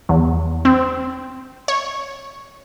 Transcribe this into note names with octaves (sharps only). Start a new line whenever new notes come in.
E2
C4
C#5